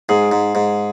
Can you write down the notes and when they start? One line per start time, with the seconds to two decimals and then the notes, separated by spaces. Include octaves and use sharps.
0.09 G#2 G#4
0.32 G#2
0.55 G#2